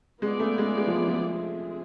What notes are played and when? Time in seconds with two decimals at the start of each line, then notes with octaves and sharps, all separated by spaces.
0.21 G#3 B3 F4 G#4 D5
0.40 A3
0.58 G#3
0.77 G#3
0.87 F3
1.07 F3
1.33 D3 G#3 C4 G#4